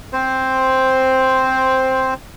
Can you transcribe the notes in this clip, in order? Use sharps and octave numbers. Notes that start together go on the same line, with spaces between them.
C4 C5